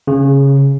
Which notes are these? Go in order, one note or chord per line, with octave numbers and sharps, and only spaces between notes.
C#3